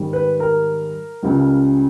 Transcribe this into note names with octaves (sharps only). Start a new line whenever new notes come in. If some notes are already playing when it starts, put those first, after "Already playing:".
Already playing: G#2 D#3 G3
B4
A#4
C#2 C#3 G3